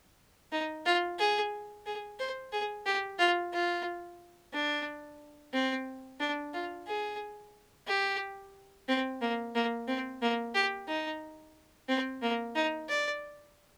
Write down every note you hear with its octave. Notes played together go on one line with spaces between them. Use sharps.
D#4
F4
G#4
G#4
C5
G#4
G4
F4
F4
D4
C4
D4
F4
G#4
G4
C4
A#3
A#3
C4
A#3
G4
D#4
C4
A#3
D#4
D5